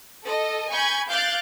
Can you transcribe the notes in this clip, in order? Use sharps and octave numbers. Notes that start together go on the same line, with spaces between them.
A4 D#5
G#5 B5 C#6 G6 G#6
F5 D6 F#6 G6 A6